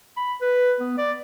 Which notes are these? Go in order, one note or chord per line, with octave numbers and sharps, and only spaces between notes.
B5
B4
B3
D5